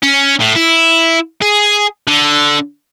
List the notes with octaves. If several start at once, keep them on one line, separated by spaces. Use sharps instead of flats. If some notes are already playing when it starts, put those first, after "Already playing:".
C#4
A2
E4
G#4
D3